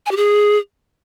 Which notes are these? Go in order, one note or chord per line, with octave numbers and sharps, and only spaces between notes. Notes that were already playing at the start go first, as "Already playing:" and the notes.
G#5
G4
G#4